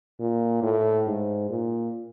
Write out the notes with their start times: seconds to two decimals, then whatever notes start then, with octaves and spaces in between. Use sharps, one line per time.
0.20 A#2
0.63 A2
1.07 G#2
1.50 A#2